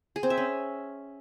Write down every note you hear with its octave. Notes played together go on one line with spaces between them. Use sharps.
G#4
C4
E5
C#4